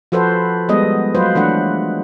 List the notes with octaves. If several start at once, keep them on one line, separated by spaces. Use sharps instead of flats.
F3 F#4 A4 B4 C5
G3 G#3 B3 D#5
F#3 F4 B4 C5
E3 A3 D4 F#5